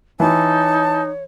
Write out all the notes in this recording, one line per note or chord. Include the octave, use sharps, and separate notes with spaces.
E3 D#4 C#5 A5